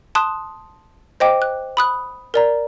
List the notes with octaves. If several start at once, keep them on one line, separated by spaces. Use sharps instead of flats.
A5 C6 D#6 F#6
C5 D#5 G5 D6
F#6
B5 D#6 F#6
A#4 D5 A#5